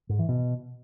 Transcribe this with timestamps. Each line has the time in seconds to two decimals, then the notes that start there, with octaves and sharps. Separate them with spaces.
0.09 G#2
0.19 E3
0.29 B2